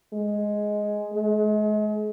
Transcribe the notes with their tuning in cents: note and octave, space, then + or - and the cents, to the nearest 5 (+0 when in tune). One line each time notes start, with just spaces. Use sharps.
G#3 +5
G#3 +40